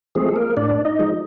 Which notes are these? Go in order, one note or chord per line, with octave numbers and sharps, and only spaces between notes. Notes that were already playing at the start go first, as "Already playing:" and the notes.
F3 G#3 A3 C4 G#4
A4
A#3 A#4
A2 D4 D5
D#4 D#5
F3 G#3